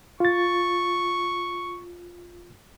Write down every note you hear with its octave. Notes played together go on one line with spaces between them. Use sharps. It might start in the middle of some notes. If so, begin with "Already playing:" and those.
F4 C#6 A6